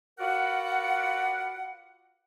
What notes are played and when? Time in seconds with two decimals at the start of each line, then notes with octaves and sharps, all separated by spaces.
0.19 F4 F#4 A#4 B4 D5 F#5